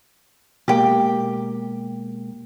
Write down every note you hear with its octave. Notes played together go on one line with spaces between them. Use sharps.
B2 G#3 A#3 G4 G5